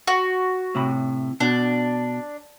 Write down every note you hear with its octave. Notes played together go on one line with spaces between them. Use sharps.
F#4
A2 C3 B5
B2 D4